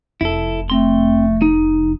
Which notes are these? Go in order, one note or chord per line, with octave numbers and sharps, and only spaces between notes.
F1 E4 A4
A3 C4 C6
D#4